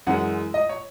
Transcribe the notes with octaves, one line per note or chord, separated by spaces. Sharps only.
F#2 E3 G#3 F#5
D#5
C#5